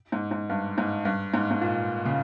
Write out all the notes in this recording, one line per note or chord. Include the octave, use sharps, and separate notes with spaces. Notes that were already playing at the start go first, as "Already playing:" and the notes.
G#2
G#2
G2
G#2
G2
G#2
G#2
A#2
C#3